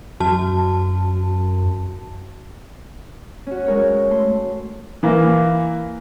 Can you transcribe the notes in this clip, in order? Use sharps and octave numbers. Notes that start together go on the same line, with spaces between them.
F#2 F#4 A5
C#4 F#4
G#3 A#4 C#5
A3 C6
E3 A#3